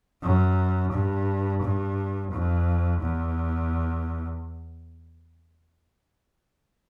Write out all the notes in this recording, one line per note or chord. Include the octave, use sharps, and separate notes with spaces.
F#2
G2
G2
F2
E2